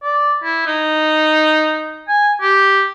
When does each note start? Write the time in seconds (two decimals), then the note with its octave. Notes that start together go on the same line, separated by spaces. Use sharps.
0.03 D5
0.43 E4
0.66 D#4
2.08 G#5
2.41 G4